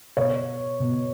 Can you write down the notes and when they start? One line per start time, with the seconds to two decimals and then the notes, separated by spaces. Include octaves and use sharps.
0.17 B2 C#5
0.80 B2